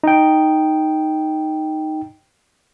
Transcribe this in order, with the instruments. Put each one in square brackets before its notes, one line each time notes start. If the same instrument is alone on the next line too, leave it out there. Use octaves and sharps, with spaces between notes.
[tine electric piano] D#4 G5